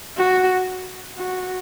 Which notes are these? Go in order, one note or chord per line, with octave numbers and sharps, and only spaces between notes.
F#4
F#4